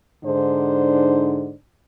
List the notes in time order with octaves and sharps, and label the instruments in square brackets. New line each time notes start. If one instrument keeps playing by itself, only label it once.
[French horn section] G#2 D3 D4 D#4 C5